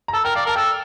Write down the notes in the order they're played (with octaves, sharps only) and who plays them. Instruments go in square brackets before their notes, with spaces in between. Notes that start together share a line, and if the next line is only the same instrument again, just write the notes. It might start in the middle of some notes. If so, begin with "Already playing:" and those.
[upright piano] A#5
[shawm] A4 [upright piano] A5
[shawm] A#4 [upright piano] G5
[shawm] D5 [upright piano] F5
[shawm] A#4
[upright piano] A5
[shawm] A4 [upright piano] G5